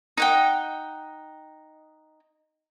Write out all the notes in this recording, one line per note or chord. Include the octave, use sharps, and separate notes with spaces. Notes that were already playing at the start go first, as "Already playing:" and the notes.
D#4 F#5 G5